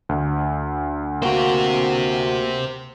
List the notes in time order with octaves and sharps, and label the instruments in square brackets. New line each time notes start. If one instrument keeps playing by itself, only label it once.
[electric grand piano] D2
[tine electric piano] A#3 F#4 [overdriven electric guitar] G4 C5